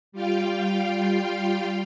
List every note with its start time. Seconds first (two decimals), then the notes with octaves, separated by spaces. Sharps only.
0.12 G3 F4 F5 G5